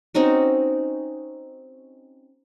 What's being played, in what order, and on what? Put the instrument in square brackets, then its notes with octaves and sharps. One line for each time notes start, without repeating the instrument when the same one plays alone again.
[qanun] C4 C#4 D#4 F#4